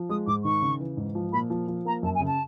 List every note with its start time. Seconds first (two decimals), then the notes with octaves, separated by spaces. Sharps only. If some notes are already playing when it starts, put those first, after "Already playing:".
Already playing: F3
0.09 G#3 D#6
0.27 G#2 D6
0.45 D#3 C#6
0.62 C#3
0.80 E3
0.97 G#2
1.15 F3
1.32 A#2 B5
1.50 F3
1.68 F3
1.85 A#3 A#5
2.03 F#2 A5
2.15 G#5
2.20 C#3
2.27 A5